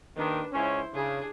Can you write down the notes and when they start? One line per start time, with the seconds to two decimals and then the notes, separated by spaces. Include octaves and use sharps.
0.16 D#2 D#3 D4 B4
0.53 C#2 C#4 E4 C5
0.93 C#3 D4 G#4